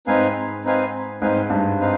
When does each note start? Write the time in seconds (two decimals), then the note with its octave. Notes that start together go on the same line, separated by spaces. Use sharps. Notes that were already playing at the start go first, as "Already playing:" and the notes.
0.07 G#2 C4 D#4 B4 F5 G#5
0.65 C4 D#4 B4 F5 G#5
1.21 G#2 C4 D#4 B4 F5 G#5
1.50 G2
1.79 C4 D#4 B4 F5